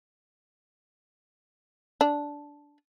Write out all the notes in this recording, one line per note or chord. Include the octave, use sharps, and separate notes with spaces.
D4